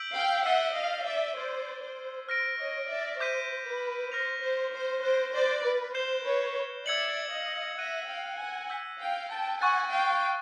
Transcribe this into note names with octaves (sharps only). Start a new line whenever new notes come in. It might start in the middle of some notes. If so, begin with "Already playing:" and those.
Already playing: E6 G6 B6 D7 F#7
F5 G5
E5 F#5 E6 A6 C7 D#7 G7
D#5 F5
D5 E5
C5 D5 F6 G#6 B6
C5
C5 F6 A#6 D7
C#5 D#5
D5 E5
C5 D6 G6 B6 D#7
B4
C5 F6 A#6 C#7 F7
C5
C5
C5 F#6 A6 D7
C5 D5
B4
C5 G6 C7 E7 G7
B4 C#5
D5 E5 E6 G#6 C#7 F#7
D#5 F5
E5 F#5 F#6 A#6 D#7
F5 G5
F#5 G#5
E6 G6 B6
F5 G5
G5 A5
F#5 G#5 C#6 F#6 A6
F5 G5